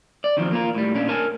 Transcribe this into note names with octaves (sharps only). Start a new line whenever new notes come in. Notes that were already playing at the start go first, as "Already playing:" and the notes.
D5
F2 D#3 F3 F#3 C4
A#3 F4 A#4
A2 G3
A#2 C#4 D4
A#4 C#5 G#5 A5